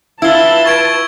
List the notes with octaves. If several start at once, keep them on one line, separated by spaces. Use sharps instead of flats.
E4 F4 B4 A5 E6 G7
C#6 G#6 D7